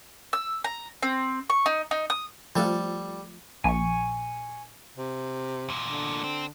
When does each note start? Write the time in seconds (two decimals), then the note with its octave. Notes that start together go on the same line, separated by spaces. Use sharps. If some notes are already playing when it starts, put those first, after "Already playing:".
0.33 E6
0.64 A#5
1.03 C4
1.50 C#6
1.66 D#4
1.91 D#4
2.10 D#6
2.56 F3 G3 A3 F4 A4
3.64 A#1 G#5 C#6
4.97 C3
5.69 E2 A#2
5.84 D3
6.24 C4